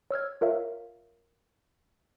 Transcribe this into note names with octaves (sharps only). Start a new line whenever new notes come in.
C#5 E6 F6 G#6
F4 A#4 C#5 E5 F5